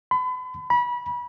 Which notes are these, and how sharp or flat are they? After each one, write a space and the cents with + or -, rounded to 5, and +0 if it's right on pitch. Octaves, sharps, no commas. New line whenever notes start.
B5 +40
B5 -25